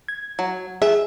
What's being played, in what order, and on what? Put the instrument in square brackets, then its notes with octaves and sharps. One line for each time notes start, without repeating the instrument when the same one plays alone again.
[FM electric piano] G#6
[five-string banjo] F#3
[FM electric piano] G#4 [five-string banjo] E5